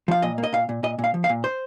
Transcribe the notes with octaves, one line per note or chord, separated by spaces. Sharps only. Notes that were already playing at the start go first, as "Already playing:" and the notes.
F3 F5
A#2 D#5
A#3
D#5
A#2 F5
A#2
A#2 D#5
A#2
F5
F3
F5
A#2
C5